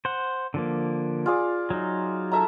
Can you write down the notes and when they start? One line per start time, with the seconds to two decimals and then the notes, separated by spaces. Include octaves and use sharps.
0.05 C5 F#5
0.54 D3 F3 A#3
1.26 F4 G#4 D5
1.70 F#3 D#4
2.32 A4 E5 A#5